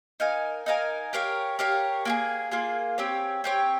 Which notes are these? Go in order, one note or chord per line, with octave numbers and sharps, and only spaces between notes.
D#4 A#4 F5 G#5
D#4 A#4 F5 G#5
G4 A#4 C#5 F5
G4 A#4 C#5 F5
A#3 F4 G#4
A#3 F4 G#4
C4 G4 C#5
C4 G4 C#5